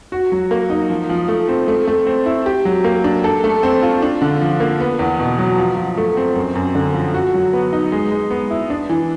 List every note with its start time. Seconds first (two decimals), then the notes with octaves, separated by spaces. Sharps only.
0.12 F#4
0.32 F#3
0.51 A#3
0.70 D#4
0.90 F3
1.09 F3
1.28 A3
1.49 C4
1.68 A3
1.87 A3
2.07 C4
2.26 E4
2.46 G4
2.65 F#3
2.84 A#3
3.04 D4
3.24 A4
3.44 A3
3.63 C4
3.83 F4
4.02 D4
4.22 D3
4.41 F3
4.60 A#3
4.80 B3
4.99 E2
5.19 B2
5.39 F#3
5.58 F3
5.77 F3
5.97 A3
6.17 C4
6.36 F#2
6.55 F#2
6.75 D3
6.94 F3
7.14 F#4
7.34 F#3
7.53 B3
7.73 D#4
7.92 G#3
8.11 G#3
8.31 B3
8.50 E4
8.70 D4
8.89 E3